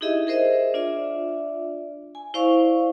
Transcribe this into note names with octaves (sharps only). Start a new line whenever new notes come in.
D#4 E4 G4 G#4 D#5 E5
G#4 A#4 C5 D#5 E5
D4 F4 D5 E5
G#5
E4 C5 D5 F5 C#6